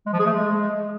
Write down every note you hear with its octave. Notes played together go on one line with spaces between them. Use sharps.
G#3
F3
G#4
A3
G#3